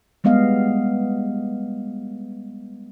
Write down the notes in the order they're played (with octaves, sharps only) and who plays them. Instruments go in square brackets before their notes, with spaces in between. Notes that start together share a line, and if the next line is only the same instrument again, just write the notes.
[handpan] G3 G#3 B3 D#5 F5